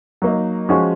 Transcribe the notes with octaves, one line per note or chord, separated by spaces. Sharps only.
F#3 A#3 D#4
F3 G#3 C#4 F#4